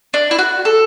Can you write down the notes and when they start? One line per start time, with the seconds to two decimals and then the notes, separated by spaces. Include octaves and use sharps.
0.14 D4
0.31 E4
0.39 F#4
0.65 A4